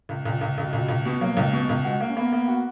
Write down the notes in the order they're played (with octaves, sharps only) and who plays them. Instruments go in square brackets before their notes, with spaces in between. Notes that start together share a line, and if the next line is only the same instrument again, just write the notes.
[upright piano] C#2
[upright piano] C#2 [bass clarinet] A#2
[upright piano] C#2
[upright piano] C#2 [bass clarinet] C#3
[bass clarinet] B2
[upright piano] C#2 [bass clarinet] A#2
[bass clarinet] B2
[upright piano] C#2
B2
[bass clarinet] F#3 [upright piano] A#3
[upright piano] C#2 [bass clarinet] F#3
[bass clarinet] G#3
[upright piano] B2
[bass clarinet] G#3
[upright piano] C#2
[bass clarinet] G#3 [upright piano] F#4
[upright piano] A#3
[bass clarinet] C#4
[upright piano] A#3 [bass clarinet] B3
[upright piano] A#3
F#4